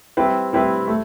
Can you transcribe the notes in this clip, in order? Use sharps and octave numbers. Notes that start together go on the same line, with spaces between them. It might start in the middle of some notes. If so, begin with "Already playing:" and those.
G3 C4 E4 B4
G3 C4 E4 B4
A3